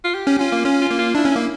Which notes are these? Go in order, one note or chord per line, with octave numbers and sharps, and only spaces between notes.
F4
G4
C#4
C#4 F4
A#3
C#4 F4
F4
A#3
F4
D4 E4
C#4
A#3 E4